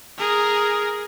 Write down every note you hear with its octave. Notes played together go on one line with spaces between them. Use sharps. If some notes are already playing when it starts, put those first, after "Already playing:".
G#4 A#4